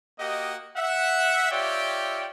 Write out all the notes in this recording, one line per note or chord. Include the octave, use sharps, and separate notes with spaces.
A#3 F#4 G4 D#5
E5 F#5
F4 G4 C#5 D5 E5 G5